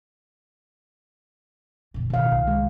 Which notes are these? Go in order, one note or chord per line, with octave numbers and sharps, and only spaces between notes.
F#1 A#2
D1 B2 D#3 F5
C2
G#3